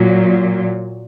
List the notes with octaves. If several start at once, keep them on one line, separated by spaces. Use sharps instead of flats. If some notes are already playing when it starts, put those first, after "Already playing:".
Already playing: A#2 F#3